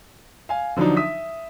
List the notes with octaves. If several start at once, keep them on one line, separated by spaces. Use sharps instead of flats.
F5 G#5
D3 F3 F#3 D4 D#4
E5 D#6 B6